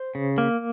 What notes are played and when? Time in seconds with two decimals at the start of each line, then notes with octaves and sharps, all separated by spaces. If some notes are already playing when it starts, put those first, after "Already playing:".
Already playing: C5
0.15 C#3
0.38 A#3